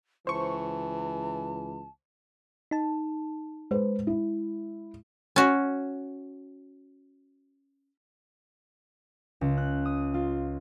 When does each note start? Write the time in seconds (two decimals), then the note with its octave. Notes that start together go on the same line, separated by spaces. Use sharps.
0.27 C#2 E3 C5 A5 C#6
2.71 D#4 A5
3.71 G#3 B4 C5
4.07 E4
5.36 C#4 F#4
9.41 C#2
9.58 F#6
9.85 D#6
10.14 F4